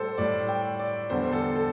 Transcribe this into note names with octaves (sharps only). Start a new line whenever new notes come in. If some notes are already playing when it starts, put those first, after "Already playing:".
Already playing: A2 G3 A4 C5
A2 G3 D5
G5
D5
E2 D3 G3 C5
A4
A4